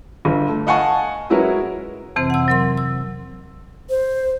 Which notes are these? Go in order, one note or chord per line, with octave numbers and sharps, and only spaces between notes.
G1
A3
D#5 F5 F#5 G#5 A5 C#6
F#3 G#3 C#4 E4 A#4 B4
F2 C3 E3 C4 C5
F#5 E6
F#3 A#4 C6
E6
C5